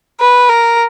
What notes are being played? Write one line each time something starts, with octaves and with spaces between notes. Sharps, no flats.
B4
A#4